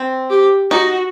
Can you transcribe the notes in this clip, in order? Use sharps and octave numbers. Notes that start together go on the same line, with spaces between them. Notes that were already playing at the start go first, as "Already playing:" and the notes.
Already playing: C4
G4
D#4 F#4